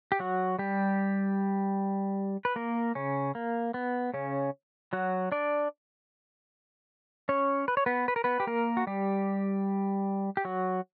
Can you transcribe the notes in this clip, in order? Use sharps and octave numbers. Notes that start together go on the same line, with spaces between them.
G4
F#3 F#4
G3 G4
B4
A#3 A#4
C#3 C#4
A#3
B3
C#3 C#4
F#3 F#4
D4 D5
C#4 C#5
B4
C#5
B3 B4
B4
A#4
B3 B4
G4
A#3 A#4
F#4
G3 G4
G4
F#3 F#4